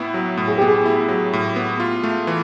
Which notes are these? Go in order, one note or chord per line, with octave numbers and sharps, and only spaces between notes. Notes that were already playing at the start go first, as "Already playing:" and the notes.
Already playing: A2 B3 E4
F#3
A2
G#4
B3 G4
G#4
E4
F#3
A2
B3
F4
A3
E3